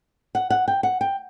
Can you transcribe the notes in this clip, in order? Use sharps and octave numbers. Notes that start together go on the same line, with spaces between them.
F#5
F#5
G5
F#5
G5